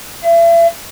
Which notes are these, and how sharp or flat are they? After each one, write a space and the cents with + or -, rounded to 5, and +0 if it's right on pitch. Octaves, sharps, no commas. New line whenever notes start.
E5 +40